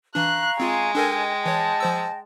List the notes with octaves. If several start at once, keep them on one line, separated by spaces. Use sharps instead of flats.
E3 D4 F5 A#5 C#6 F#6
G#3 C4 F4 G#5
D4 A4 A#4 D#5 G5
E3 C#5 A5
F3 C5 E6